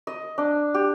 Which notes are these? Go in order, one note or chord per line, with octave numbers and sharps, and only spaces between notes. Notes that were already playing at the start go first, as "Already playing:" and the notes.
D#5
D4
G4